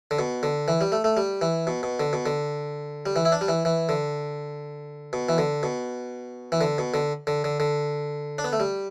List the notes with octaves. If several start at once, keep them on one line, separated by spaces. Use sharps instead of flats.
D3
B2
D3
E3
G3
A3
A3
G3
E3
B2
B2
D3
B2
D3
G3
E3
E4
D4
G3
E3
E3
D3
B2
E3
D3
B2
E3
D3
B2
D3
D3
D3
D3
D4
B3
A3
G3